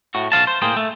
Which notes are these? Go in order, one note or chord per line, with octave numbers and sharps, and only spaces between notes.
A2 F#4
B1 D#3 F5 A5
C5
A2 A#3 G#4 C5 G5
A3